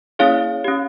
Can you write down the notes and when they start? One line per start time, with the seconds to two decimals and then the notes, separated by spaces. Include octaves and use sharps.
0.19 A#3 C#4 E4 G#4 C#5 F5
0.64 C#4 G4